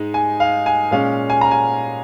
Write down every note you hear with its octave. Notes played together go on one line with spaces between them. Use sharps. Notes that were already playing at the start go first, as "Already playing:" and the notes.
Already playing: G#2 G#3 D#4
G#5
F5
G#5
A#2 G#3 C#4 F5
G#5
A#5
G#5